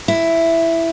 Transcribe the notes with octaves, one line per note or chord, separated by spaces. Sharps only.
E4